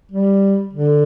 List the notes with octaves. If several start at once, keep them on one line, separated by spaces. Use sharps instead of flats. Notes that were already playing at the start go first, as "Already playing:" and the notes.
G3
D3